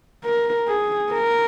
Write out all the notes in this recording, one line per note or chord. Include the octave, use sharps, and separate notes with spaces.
A#4
G#4
A#4